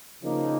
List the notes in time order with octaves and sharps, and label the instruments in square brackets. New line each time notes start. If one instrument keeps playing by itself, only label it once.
[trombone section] C#3 F3 A#3 D#4